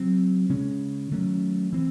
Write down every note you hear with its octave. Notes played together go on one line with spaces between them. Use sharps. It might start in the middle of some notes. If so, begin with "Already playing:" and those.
Already playing: C#3 F#3 C4
C#3 G#3 C#4
D#3 F#3 A3 C#4
E3 C4